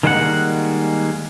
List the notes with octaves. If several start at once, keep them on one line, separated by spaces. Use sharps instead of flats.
D#3 G3 G#3 A#3 E4 F#5